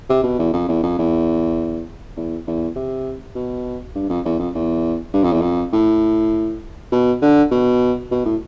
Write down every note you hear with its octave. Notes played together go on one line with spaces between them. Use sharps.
C3
B2
E2
F2
E2
F2
E2
E2
E2
C3
B2
G2
F2
E2
F2
E2
G2
F2
E2
F2
A2
B2
D3
B2
B2
A2